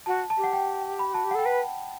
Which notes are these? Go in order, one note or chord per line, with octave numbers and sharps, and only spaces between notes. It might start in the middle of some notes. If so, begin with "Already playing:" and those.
F#4 A5
A5
G4
F#5
G5
B5
F#4 A5
G4
F#5
A4 G5
B4 F#5